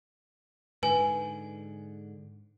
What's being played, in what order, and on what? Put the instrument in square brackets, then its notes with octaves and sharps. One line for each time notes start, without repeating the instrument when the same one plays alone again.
[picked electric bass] G#2 D3 [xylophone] B4 G#5